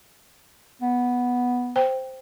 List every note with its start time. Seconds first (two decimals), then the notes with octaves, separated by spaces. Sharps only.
0.82 B3
1.76 C5 G5